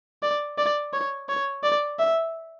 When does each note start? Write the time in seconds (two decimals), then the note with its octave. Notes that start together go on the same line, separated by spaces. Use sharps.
0.23 D5
0.58 D5
0.93 C#5
1.29 C#5
1.64 D5
1.99 E5